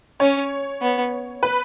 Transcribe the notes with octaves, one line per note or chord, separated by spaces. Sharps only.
C#4 C#5
B3
B4